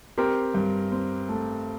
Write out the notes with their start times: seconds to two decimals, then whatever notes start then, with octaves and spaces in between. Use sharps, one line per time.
0.18 C4 G4 A#4
0.54 G2
0.92 C4
1.29 A3